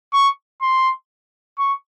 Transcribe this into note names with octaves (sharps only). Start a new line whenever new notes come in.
C#6
C6
C#6